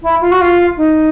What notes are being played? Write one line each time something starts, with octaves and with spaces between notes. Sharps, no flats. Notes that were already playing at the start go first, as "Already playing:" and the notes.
E4
F4
F#4
F4
D#4